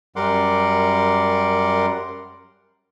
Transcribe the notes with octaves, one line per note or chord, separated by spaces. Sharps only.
F#2 G3 A#4 F#5 C6 D6